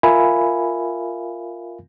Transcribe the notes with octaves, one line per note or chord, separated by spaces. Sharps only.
F4 A#4 E5 F5 G#5 B5